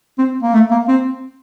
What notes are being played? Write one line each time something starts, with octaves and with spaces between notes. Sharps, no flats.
C4
A#3
A3
A#3
C4